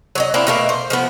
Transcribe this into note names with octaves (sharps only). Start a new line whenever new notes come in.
F#3 C#5 D#5
A#3 C4 D4 E4
B2 A3 A#3
C5
F3 A3 B3